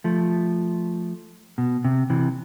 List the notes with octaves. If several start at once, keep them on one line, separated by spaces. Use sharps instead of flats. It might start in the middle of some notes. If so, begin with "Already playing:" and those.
F3 A3
B2
C3
C3 E3